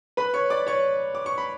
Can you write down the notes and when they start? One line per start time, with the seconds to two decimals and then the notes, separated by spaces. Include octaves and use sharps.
0.17 B4 B5
0.34 C#5 C#6
0.50 D5 D6
0.67 C#5 C#6
1.15 D6
1.26 C#6
1.38 B5